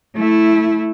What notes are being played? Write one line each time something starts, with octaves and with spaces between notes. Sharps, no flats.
A3 E4